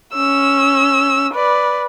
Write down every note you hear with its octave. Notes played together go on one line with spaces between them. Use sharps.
C#4 E6
B4 D5